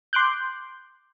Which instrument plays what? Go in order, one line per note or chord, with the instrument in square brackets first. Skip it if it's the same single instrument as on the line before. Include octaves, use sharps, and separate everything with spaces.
[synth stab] C6 D6 F#6 G6